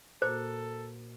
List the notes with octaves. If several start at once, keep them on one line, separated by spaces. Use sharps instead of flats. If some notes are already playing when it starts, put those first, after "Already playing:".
A#2 A#3 F#4 A4 C5